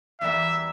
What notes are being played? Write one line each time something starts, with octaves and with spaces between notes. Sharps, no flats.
E2 E3 G3 A#3 E4 E5